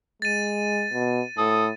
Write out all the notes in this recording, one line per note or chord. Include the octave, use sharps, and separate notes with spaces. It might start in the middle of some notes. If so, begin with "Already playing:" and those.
G#3 A6 D#7
B2
A2 A4 D#6